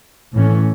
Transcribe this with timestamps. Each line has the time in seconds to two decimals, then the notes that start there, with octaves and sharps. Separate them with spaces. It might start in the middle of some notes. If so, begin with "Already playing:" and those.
0.33 A2 E3 A3 C#4